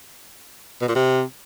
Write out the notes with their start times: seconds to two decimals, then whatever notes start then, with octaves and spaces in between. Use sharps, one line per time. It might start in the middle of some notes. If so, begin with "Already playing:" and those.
0.81 B2
0.88 A#2
0.95 C3